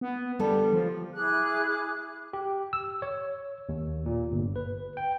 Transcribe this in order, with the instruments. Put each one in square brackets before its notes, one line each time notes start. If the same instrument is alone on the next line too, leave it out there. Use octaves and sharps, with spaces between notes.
[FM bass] B3
[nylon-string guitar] D3 B3 A4 [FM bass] G3
[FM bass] F3
[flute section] E4 G#4 D6 F#6
[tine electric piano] G4
E6
C#5
D#2
A#2
G1
B4
G5